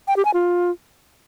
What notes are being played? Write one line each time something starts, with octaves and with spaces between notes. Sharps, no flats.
G5
G4
G#5
F4